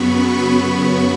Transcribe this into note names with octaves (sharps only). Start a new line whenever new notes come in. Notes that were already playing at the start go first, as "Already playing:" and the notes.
Already playing: F#2 C#3 F#3 B3 B5 C#6
B5